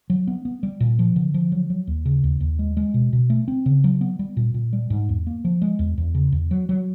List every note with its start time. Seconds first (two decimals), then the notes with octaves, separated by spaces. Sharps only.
0.10 F#3
0.27 B3
0.45 B3
0.63 G3
0.80 A#2
0.99 F3
1.16 D3
1.34 F3
1.52 F#3
1.70 F#3
1.87 D#2
2.05 C#3
2.24 D#2
2.40 D#2
2.59 G#3
2.77 G#3
2.94 B2
3.13 B2
3.30 A3
3.48 C4
3.66 C#3
3.84 F#3
4.01 B3
4.19 G3
4.37 A#2
4.54 A#2
4.73 G3
4.90 G#2
5.09 E2
5.27 A#3
5.44 F3
5.62 G#3
5.79 E2
5.98 E2
6.15 C#3
6.32 E2
6.51 F#3
6.69 F#3